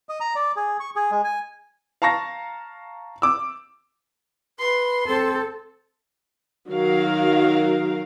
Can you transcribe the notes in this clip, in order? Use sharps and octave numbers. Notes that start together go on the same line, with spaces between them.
D#5
A#5
D5
G#4
C#6
G#4
G#3
G#5
F5 A5 A#5 C#6 A#6
D6 E6
B4 C6
C4 A4
D#3 F#3 F#4 A#4 F5